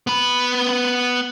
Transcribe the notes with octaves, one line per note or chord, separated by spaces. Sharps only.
B3 B5